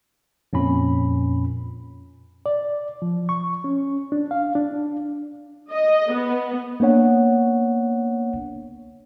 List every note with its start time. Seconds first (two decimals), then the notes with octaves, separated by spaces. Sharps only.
0.53 F2 A#2 C#4 B5
2.46 D5
3.02 F3
3.29 C#6
3.64 C#4
4.12 D4
4.31 F5
4.55 D4
5.71 D#5
6.12 B3
6.80 A#3 B3 D4 C#5 F#5